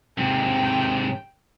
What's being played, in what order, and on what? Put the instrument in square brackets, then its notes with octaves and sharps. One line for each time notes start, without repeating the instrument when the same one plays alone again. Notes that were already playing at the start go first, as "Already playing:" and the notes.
[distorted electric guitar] G#2 C3 [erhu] G5